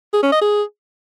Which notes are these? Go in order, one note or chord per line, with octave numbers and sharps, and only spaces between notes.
G#4
C#4
D#5
G#4